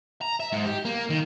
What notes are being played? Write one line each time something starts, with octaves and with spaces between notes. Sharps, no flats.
A#5
E5
G#2
G4
A#3
D#3